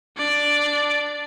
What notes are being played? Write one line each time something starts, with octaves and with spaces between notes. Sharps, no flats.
D4 D5